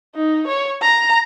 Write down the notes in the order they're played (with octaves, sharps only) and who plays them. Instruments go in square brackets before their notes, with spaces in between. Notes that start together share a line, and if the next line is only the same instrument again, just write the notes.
[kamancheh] D#4
C#5
A#5